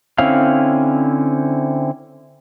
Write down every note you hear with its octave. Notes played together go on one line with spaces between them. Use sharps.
D3 C4 C#4 E4 F5